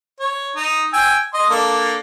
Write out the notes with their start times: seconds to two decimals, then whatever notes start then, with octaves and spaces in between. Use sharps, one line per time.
0.20 C#5
0.56 D#4
0.93 G5 G#5 E6
1.34 D#5 C6
1.50 A#3 D4 A4